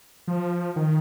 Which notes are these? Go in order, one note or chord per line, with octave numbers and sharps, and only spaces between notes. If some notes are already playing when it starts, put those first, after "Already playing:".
F3
D#3